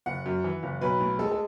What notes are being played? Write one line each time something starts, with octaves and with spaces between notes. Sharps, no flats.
F#1 F#5
F#2
E3
F#1
B1 B4
A2
G#3 A4
A4